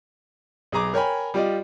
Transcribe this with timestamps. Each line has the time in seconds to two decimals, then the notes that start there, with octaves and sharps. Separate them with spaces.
0.72 B1 G#4 A#5 D6
0.94 A#4 C#5 G5 G#5 B5
1.34 G3 F4 G4 D5 D#5